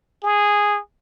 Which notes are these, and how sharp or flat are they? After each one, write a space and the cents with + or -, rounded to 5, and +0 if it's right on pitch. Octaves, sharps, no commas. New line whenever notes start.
G#4 -10